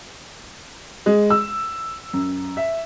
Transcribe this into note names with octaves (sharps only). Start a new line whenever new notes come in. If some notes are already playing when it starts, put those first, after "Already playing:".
G#3
E6
F#2
E5